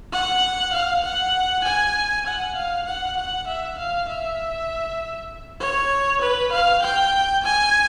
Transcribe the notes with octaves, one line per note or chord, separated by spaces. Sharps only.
F#5
F5
F#5
G#5
F#5
F5
F#5
F#5
E5
F5
E5
C#5
B4
F5
G5
G#5